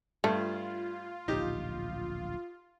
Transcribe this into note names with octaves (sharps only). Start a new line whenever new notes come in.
G2 A3 F4
D1 A#1 D#4 G4